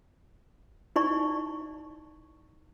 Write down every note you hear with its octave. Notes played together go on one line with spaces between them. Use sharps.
D#4 E4 D5 C#6